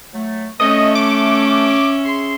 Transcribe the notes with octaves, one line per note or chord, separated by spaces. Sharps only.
F#3 A3
A3 C#4 D#5 E5
D6
G#4 C6